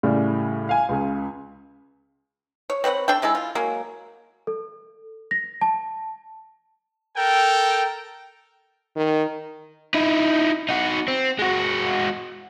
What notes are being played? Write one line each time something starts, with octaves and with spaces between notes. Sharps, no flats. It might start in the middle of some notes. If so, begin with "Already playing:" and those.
A2 C#3 G3
F5 G#5
C#2 C#3
C#5
C4 B4 C#5 F#5
D4 A4 G5
D3 G#3 E4 A4
F4
F#3 G#3 A#3
A4
A#6
A5
A4 A#4 G5
D#3
D#4 E4
D#4 F#4
C4
G#3 F#4